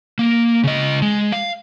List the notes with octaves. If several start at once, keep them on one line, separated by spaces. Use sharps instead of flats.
A#3
C#3 D#5
G#3
F5